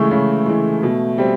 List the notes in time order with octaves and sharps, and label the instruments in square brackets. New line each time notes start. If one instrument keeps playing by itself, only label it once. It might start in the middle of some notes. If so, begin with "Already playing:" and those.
Already playing: [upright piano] C#3 E3 G#3 [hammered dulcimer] A3
[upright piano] C#3
E3 G#3
B2
G3 C4